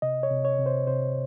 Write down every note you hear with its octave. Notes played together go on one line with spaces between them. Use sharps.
C3 D#5
C#5
C3
C#5
C3
C5
C3 C5